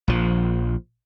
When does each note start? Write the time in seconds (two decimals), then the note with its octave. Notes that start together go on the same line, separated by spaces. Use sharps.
0.08 A#1 F3